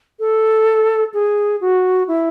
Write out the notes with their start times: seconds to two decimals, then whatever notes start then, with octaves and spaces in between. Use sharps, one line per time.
0.20 A4
1.14 G#4
1.61 F#4
2.08 E4